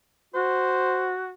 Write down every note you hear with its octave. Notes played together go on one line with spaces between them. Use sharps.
F#4 C5